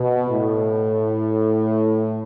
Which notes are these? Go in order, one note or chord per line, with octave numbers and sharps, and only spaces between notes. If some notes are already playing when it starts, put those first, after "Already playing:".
Already playing: B2
A2